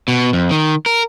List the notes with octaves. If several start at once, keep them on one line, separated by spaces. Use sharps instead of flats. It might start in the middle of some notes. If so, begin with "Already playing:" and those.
B2
F2
D#3
A#4